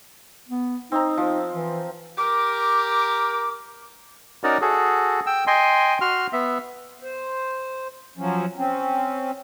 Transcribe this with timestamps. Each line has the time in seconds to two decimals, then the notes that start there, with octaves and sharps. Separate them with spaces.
0.48 B3
0.92 C4 D#4 A#5
1.17 F3
1.52 E3
2.18 G4 A#4 D6
4.44 C#4 D#4 F#4 A#4 D5
4.62 F#4 G#4 A4
5.27 G5 E6
5.47 D#5 G5 G#5 C6
6.01 F#4 C6 F6
6.33 B3 E5
7.03 C5
8.17 F3 F#3 C#4
8.57 C4 C#4